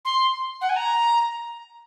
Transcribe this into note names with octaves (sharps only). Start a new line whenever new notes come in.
C6
F#5
G#5
A#5